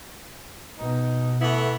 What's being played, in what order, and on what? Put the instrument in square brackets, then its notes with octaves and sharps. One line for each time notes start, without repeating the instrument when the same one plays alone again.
[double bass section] B2 [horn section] D#4
[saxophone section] E3 B3 E4 [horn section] A3